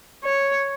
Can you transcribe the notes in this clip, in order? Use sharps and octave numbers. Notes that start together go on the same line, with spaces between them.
C#5